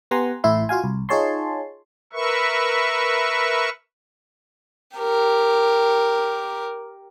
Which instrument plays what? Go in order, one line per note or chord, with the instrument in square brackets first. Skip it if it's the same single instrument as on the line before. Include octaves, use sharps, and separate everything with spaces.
[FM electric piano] B3 G4 F#5 G#5 A#5 C6
A1 A2 E4 E5 C6
F4 F#4 F5 G#5
C2
D#4 F4 G#4 C#5 A5 C6
[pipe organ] A#4 B4 E5 C#6
[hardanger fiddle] G4 A#4